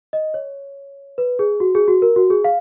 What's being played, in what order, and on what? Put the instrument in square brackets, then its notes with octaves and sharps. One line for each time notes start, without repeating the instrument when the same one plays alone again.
[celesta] D#5
C#5
B4
G#4
F#4
G#4
F#4
A#4
F#4
G#4
F5